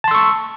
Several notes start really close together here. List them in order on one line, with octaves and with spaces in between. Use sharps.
A5 C6 E6 C#6